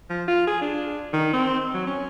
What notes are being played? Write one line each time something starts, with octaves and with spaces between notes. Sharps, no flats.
F3
F4
G#4
D4
D#3
C4
F#3
C#4